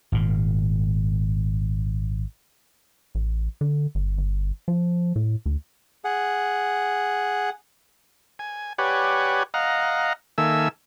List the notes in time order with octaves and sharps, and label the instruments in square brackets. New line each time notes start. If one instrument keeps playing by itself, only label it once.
[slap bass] G#1 A#2
[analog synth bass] A1
D3
G1
G1
F3
A2
D2
[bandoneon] G#4 F#5
[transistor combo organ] G#5
G4 B4 C#5 D5 F#5 G#5
D#5 F5 F#5 A#5
D#3 A#3 A4 E5 G#5 E6